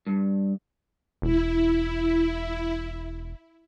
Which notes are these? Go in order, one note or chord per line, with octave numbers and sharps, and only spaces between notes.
G2
E1 E4